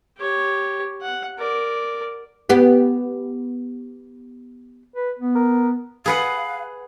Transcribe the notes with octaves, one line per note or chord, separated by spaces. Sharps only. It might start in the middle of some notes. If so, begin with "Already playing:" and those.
G4 C#5
F#5
A#4 D5
B3 G4
B4
B3
A#4
G#4 B4 F5 F#5